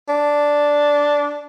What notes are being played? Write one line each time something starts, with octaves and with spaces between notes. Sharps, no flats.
D4